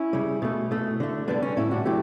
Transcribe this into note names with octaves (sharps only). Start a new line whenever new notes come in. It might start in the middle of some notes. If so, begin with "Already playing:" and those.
Already playing: C#4 E4
C#3 G3
B2 A3
B2 A3
D3 A3
D3 G3 B3 D4
C#4
A2 G3 C#4 E4
D4 F#4
D3 F#3 A3 E4 G4